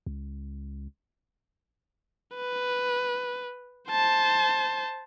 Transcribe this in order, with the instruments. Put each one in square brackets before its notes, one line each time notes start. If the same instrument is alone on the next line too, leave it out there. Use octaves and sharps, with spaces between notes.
[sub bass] C#2
[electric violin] B4
C5 A5